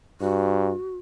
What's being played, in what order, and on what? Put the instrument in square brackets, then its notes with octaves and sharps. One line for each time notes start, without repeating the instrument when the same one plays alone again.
[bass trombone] G2 [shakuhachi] F#4